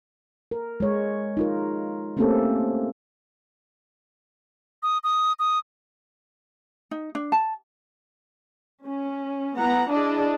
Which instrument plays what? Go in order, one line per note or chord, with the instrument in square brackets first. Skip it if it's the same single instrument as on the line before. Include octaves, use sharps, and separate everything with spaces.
[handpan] A#4
G#3 C#5
D#4 F4 A#4
A3 A#3 C4 C#4 G4 A4
[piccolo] D#6
D#6
D#6
[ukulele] D#4
D4
A5
[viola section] C#4
B3 E4 F#5 A#5
D4 E4 G#4 D5 D#5